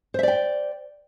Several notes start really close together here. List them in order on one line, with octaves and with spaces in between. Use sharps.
C5 E5 D5 G5